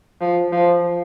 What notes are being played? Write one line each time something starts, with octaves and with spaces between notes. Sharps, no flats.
F3
F3